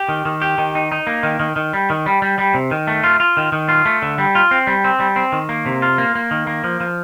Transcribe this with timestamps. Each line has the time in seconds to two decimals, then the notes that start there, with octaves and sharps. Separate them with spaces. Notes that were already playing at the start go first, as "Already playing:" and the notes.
Already playing: G4
0.09 D#3
0.25 D#3
0.42 G4
0.58 D#3
0.75 D#4
0.92 D#4
1.07 A#3
1.23 D#3
1.40 D#3
1.56 D#3
1.73 G3
1.90 D#3
2.06 G3
2.22 G3
2.39 G3
2.54 C3
2.71 D#3
2.87 A3
3.04 F4
3.20 F4
3.37 D#3
3.52 D#3
3.69 F4
3.85 A3
4.02 D3
4.18 G3
4.35 F4
4.51 C4
4.67 G3
4.84 C4
5.00 G3
5.16 C4
5.32 D#3
5.49 A#3
5.66 C3
5.82 F4
5.98 A#3
6.15 A#3
6.31 D#3
6.47 A#3
6.64 F3
6.81 F3